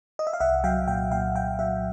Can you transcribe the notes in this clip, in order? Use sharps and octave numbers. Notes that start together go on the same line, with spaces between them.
D#5
E5
F5
C2 E5 F#5
F#3 F5 G5
A#2 F5 G5
A#2 F5 G5
F#3 F5 G5
F#3 E5 F#5